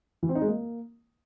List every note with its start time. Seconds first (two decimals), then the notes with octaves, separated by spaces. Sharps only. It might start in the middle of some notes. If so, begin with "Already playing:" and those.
0.23 E3
0.29 C4
0.35 D#4
0.42 G#3
0.48 A#3